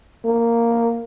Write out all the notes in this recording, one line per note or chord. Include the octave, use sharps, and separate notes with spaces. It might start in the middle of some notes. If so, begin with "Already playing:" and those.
A#3